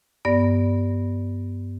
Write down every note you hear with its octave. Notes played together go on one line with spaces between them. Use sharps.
G2 B3 D5 A#6